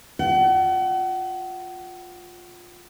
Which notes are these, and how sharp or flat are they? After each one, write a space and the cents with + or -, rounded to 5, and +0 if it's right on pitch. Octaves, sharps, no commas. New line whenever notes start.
F4 +15 F#5 +35